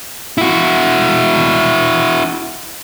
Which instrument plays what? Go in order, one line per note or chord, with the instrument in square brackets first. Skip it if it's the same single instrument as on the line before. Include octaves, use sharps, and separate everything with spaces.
[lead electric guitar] E4 F#4